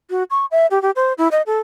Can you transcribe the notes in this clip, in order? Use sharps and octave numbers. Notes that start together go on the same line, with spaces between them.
F#4
C#6
E5
G4
G4
C5
E4
D#5
A4